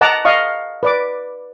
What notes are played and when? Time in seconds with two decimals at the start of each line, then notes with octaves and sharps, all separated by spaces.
0.01 D#5 F#5 A5 A#5 D6
0.25 D#5 F5 C#6
0.83 B4 D5 D6